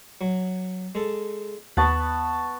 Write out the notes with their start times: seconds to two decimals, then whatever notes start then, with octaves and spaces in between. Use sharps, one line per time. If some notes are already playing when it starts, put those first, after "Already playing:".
0.21 F#3
0.95 G#3 A4
1.77 D#2 B3 A5 B5 C#6